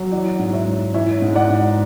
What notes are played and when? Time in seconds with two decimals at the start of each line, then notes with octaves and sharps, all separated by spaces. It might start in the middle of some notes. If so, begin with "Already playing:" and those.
Already playing: F#3
0.12 E3 D5 F#5
0.39 G#2
0.53 C#5 E5
0.67 G#2
0.94 E3 C#5 E5
1.22 G#2
1.36 D5 F#5
1.50 G#2